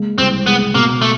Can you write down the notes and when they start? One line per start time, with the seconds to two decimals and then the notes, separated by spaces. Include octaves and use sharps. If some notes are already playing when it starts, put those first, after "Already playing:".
Already playing: G#3 A#3
0.18 C2 C4
0.46 G#3 B3
0.75 B2 A#3
1.02 A3